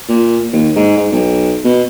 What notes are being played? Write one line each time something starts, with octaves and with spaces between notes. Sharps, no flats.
A#2
D#2
G#2
G#2
B1
B2